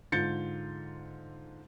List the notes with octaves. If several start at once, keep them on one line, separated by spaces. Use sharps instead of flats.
G#2 D3 F4 G6 A6 C#7